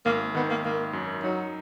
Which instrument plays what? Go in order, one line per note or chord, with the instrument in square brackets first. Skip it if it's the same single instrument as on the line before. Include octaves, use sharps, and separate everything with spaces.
[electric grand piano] G#1 [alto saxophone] A#3
[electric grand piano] D#3 [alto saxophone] B3
[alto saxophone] A#3
[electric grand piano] G#1 [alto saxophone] A#3
[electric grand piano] F#2
[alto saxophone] F#3 [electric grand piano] D#4